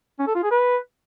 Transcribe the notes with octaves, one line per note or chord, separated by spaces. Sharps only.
C#4
A4
F4
G#4
B4